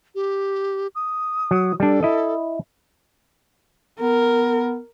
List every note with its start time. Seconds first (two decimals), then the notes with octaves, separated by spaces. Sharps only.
0.15 G4
0.95 D#6
1.51 F#3
1.80 G3 D4 A4
2.03 E4 D#5
4.00 B3 A#4